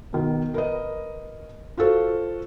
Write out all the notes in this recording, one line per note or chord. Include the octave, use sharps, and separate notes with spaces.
B2 D#3
A#4 B4 D#5
F4 F#4 A4 C5